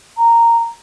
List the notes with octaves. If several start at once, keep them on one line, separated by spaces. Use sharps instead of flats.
A#5